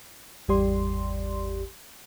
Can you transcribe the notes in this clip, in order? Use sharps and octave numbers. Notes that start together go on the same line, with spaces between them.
G#1 E2 G3 G4 D5 C6